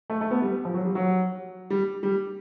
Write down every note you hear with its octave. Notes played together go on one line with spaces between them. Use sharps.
A3
A3
B3
G3
F3
F#3
G3
F#3
G3
G3